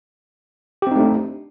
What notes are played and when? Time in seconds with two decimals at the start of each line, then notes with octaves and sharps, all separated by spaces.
0.82 G4
0.87 C4
0.91 D#4
0.96 A3
1.00 D4